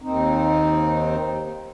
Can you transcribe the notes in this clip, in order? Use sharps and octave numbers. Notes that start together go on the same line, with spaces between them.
D#2 C4 D#4